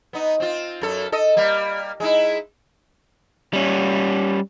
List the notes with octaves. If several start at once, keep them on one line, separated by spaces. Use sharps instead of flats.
B3 D#4
C4 F4
F#2 A4
A4 D#5
G3 A#3
G#3 D#4 E4
G3 C#4